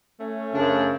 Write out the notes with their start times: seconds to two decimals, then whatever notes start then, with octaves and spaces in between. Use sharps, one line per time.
0.21 A3 C#4
0.54 F#2 C#3 F3 D4